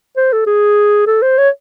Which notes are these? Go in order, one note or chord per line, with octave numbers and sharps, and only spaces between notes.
C5
A4
G#4
A4
C5
C#5